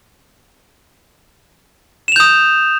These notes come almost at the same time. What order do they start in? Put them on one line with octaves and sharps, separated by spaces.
E7 F7 G6 D#6